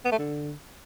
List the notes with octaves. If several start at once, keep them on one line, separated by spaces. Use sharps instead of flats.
B3
A3
D3